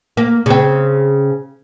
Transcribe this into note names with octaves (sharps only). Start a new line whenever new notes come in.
A#3
C#3 C4